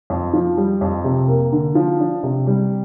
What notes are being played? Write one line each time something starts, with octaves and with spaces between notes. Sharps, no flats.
F2
F3
G3
F2
C3
A#3
D3
F3
D4
C3
G3